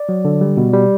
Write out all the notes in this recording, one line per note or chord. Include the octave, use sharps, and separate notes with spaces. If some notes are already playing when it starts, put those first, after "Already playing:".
Already playing: D5
F#3
D3
G3
B2
G3